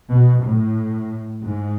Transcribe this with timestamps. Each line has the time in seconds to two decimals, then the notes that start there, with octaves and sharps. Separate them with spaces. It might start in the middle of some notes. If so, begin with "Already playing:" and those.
0.10 B2
0.44 A2
1.45 G#2